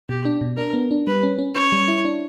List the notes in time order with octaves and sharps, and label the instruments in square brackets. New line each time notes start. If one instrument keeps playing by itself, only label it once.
[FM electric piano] B2 [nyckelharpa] G4
[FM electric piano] D4
B2
[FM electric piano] D4 [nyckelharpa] A#4
[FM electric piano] B3
D4
[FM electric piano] G3 [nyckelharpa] B4
[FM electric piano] C#4
C#4
[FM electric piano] C#4 [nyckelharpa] C#5
[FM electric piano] G3
E4
D4